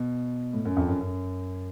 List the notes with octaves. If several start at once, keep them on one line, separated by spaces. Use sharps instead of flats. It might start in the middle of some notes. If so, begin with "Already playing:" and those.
Already playing: B2
A2
F#2
F2
F#2
F#2